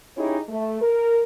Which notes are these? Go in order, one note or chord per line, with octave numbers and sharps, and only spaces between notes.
C#4 D#4 E4 G4 G#4 C#5
A3
A#4